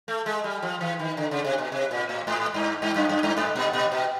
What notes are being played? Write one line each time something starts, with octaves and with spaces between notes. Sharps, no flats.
A3
G#3
G3
F3
E3
D#3
D3
C#3
C3
B2
C3
A#2
A2
G#2
G2
G2
F#2
F#2
G2
G#2
A#2
A#2
B2